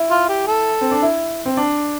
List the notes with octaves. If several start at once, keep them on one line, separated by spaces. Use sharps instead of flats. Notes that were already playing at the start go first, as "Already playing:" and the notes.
Already playing: E4
F4
G4
A4
C4
D4
E4
C4
D4